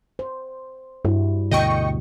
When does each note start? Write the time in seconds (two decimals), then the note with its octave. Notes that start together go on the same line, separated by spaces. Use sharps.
0.19 C5
1.05 G2 G3 E4 F#4
1.51 D2 B2 D3 D#5 G5 C#6